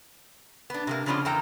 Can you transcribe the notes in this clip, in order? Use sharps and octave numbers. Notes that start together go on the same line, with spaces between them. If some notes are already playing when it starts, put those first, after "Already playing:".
B3 D4
C3 G#3 A#3
C#3 F3 B3 C#4 D4 F4
E2 A#3 A4 G5 A#5